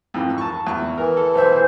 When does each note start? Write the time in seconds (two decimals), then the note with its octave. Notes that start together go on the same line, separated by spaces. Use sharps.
0.14 F2 G#2 E3
0.38 A5 C#6
0.67 E2 C#6
0.98 E3 A#4
1.17 A4
1.35 B1 C5 E5